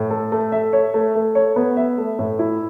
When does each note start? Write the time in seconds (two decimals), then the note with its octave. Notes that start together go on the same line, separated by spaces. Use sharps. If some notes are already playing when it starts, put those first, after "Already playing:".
Already playing: A2
0.10 A4
0.32 A3
0.52 E5
0.73 C#5
0.94 A3
1.15 A3
1.35 C#5
1.56 B3
1.77 E5
1.98 A3
2.19 A2
2.39 E4